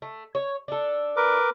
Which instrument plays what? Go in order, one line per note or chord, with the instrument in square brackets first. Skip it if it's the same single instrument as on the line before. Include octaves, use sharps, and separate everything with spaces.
[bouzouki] A3
C#5
D4 A4
[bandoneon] A#4 B4 D6